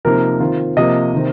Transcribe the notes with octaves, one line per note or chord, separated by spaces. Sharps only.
C3 F3 A#3 D#4 A#4
D#3 C4 F4
C3 F3 A#3 D#5
C3 D#3 C4